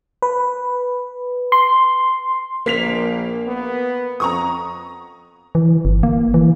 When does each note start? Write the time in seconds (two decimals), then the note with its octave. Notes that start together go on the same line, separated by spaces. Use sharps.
0.22 B4
1.52 C6
2.66 A#1 A#3 B6 F7
3.47 B3
4.20 F2 A#5 C#6 D#6
5.55 E3
5.85 G1
6.03 A#3
6.34 E3